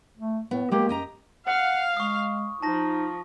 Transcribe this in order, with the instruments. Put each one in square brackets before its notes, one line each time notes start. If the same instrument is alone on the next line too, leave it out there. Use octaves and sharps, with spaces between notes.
[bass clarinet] A3
[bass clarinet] A2 [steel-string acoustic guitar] B3
[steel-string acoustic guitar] G#3 A#3 [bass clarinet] G4
[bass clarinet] F#2 [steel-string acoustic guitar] G4 D#5 A#5
[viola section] F5 [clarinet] F#5
[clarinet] G#3 [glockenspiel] C#6 D#6
[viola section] F3 [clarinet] D#4 [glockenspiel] A5 A#6